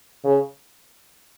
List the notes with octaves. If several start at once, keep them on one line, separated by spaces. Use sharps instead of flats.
C#3